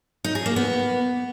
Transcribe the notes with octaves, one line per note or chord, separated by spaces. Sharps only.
D#4
G#4
A#3
B3